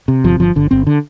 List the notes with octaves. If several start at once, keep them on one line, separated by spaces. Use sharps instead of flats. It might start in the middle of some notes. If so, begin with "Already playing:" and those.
C3
G1 F3
G1 F3
G1 D3
G1 C4
D3